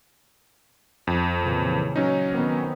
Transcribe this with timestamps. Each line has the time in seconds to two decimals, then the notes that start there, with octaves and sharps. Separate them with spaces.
1.07 F2
1.42 A#2 C#3 E3
1.96 F#3 C#4 D#4
2.32 D#3 B3 C4